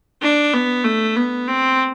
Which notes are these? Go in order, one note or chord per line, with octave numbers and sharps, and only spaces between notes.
D4
B3
A3
B3
C4